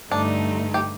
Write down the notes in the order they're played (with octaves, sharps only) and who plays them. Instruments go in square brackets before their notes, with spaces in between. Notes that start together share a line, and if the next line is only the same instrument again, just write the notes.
[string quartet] G2 D3 A3 D#4 [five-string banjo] D4
[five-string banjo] G4